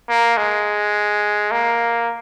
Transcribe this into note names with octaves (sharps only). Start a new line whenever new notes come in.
A#3
G#3
A#3